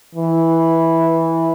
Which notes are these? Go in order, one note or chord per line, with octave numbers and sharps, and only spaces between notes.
E3